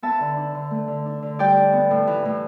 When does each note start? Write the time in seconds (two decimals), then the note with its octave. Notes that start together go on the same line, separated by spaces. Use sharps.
0.02 B3 E5 A5
0.20 D3
0.37 D4
0.55 D3
0.71 A3
0.88 D3
1.06 D4
1.22 D3
1.39 G3 D5 G5
1.57 D4
1.73 B3
1.91 A2
2.07 E3
2.25 A2